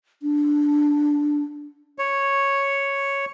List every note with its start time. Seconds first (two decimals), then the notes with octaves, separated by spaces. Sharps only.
0.23 D4
1.99 C#5